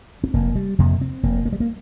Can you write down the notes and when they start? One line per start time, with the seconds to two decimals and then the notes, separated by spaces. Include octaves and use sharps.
0.24 C4
0.34 F1 A#3
0.56 G3
0.79 F2 C3 A#3
1.01 C4
1.23 F1 A#3
1.46 A#3
1.53 G3
1.60 A#3